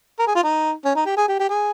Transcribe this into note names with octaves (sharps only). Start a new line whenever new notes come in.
A#4
G#4
F4
D#4
C#4
D#4
G4
G#4
G4
G4
G#4